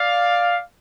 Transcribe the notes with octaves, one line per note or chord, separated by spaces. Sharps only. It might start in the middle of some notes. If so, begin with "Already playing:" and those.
Already playing: D5 F5